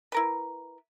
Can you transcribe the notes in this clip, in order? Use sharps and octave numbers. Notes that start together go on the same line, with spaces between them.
E4 A#4 B4